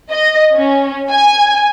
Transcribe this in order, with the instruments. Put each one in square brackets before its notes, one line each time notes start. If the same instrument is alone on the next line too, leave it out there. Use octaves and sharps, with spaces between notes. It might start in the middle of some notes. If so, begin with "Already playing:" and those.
[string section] D#5
C#4
G#5